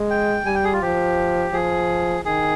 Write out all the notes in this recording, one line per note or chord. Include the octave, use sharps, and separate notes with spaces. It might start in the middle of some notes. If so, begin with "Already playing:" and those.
Already playing: G#3
G5
G3 G#5
G5
G#4
F4
F3 G4
F3 G#4
D#3 G#4